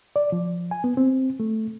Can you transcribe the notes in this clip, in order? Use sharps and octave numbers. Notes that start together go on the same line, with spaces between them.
D5
F3
G#5
B3
C4
A3